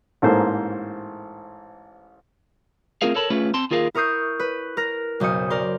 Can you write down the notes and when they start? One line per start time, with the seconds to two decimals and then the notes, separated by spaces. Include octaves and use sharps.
0.22 A1 G#2 A#3 A4 C5
3.02 A3 C4 F4 G#4 A#4 F5
3.15 A4 A#4 C#5 A5 B5
3.30 A3 C#4 F4 G#4 B4
3.54 C4 A5 C6
3.71 D#2 F4 G#4 A#4 F5
3.95 E4 A#4 C#6 D#6 G6 C7
4.40 B4
4.77 A#4 A#6
5.20 F#1 B1 C5 D#6 C#7
5.50 A#4 D5 C6